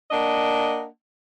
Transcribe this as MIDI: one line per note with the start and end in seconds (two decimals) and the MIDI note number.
0.11 0.85 58
0.11 0.85 62
0.11 0.85 75
0.11 0.85 78